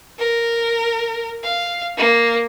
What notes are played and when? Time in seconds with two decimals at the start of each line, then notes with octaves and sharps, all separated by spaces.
0.18 A#4
1.44 F5
1.97 A#3